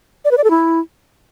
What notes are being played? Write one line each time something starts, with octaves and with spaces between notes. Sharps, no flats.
D5
B4
D5
A4
E4